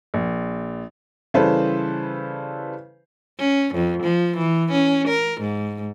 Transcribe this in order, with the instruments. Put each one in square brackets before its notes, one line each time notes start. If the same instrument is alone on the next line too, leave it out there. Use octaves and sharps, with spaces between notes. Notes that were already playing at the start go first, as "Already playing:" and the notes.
[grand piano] A#1
[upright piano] C#3 E3 G3 A4 B4 C5
[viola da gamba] C#4
F2
F3
E3
C#4
A#4
G#2